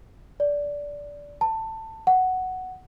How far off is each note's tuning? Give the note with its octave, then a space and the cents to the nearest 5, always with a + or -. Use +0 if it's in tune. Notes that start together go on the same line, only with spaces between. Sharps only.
D5 -15
A5 +20
F#5 +5